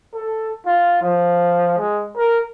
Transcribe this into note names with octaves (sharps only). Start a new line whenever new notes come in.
A4
F4
F3
G#3
A#4